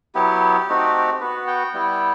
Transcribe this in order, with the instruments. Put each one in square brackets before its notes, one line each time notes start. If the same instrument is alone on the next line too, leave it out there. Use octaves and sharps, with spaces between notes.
[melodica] F#3 B3 E4 G4
A3 C4 D#4 F#4
B3 F#4 B4
G5
G3 B3 E4